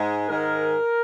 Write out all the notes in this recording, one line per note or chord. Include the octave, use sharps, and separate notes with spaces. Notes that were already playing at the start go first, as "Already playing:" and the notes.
Already playing: G#2 G#3
G#2 D#3 G#3 A#4